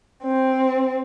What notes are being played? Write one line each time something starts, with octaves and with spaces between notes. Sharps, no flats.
C4